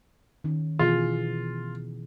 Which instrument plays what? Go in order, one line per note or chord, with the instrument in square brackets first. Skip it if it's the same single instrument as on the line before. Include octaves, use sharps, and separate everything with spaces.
[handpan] D#3 C#4
[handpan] B2 E3 G#4 [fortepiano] F4